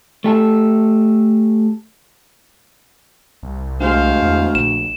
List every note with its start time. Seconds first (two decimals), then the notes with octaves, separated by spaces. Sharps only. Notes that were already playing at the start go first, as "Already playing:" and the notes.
0.24 A3 G4 A4
3.43 C2
3.81 D2 G#3 C5 F5
4.22 E2
4.55 A#1 E7